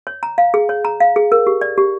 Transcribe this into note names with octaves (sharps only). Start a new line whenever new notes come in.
C#5
A#5
F5
G#4
C#5
A#5
F5
G#4
A#4
G4
D5
G4